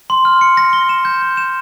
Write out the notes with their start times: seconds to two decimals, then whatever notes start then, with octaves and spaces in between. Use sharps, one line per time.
0.10 C6
0.25 F6
0.41 C#7
0.57 A#6
0.73 G7
0.89 E7
1.05 G6
1.22 G6
1.37 E7